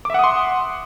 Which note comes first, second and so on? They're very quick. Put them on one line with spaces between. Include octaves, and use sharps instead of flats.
D6 E5 F#5 D#6 C6